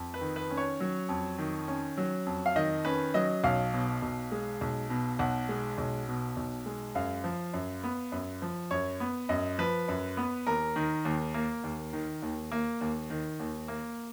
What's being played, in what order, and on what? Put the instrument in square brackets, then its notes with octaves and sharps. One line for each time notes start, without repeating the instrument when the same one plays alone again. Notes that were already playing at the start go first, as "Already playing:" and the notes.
Already playing: [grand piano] F2
B4
D#3
B4
C#4
C#5
F#3
F2
D#3
C#4
F#3
F2
F5
D#3 D#5
C#4 B4
F#3 D#5
B1 F5
B2
B1
G#3
B1
B2
B1 F#5
G#3
B1
B2
B1
G#3
F#2 F5
F3
F#2
B3
F#2
F3
F#2 C#5
B3
F#2 D#5
F3 B4
F#2
B3
D#2 A#4
D#3
D#2
A#3
D#2
D#3
D#2
A#3
D#2
D#3
D#2
A#3